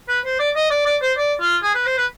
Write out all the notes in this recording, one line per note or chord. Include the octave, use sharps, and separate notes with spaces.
B4
C5
D5
D#5
D5
D5
C5
D5
F4
G#4
B4
C5
B4